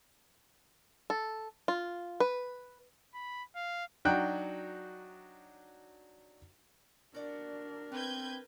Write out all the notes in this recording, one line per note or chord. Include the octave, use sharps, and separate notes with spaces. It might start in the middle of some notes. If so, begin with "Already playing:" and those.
A4
F4
B4
B5
F5
F#3 D4 D#4 F#4 G5 F#6
D4 F#4 A#4 D5 F#5
B3 C4 B4 G6 G#6